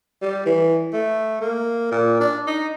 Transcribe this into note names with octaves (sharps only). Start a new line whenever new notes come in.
G3
E3
A3
A#3
A#2
D4
D#4